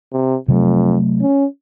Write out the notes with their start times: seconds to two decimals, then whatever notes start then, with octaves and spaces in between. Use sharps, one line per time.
0.13 C3
0.48 F2 C3 F#3 A3
1.21 C#4